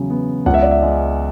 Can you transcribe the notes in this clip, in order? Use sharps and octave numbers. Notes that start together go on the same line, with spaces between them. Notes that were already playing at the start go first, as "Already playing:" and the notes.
Already playing: E2 C#3 F#3
B3
C#2 F#5
E5
D5
E5
G#3